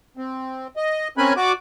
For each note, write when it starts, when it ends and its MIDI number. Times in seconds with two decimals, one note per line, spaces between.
0.17 0.67 60
0.77 1.08 75
1.18 1.33 60
1.18 1.33 61
1.18 1.33 70
1.18 1.33 80
1.18 1.33 83
1.18 1.33 90
1.36 1.52 66
1.36 1.52 74
1.36 1.52 86